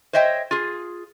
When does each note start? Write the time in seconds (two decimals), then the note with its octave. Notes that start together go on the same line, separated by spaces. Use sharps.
0.13 C5 C#5 D#5 E5 G5
0.51 F4 G#4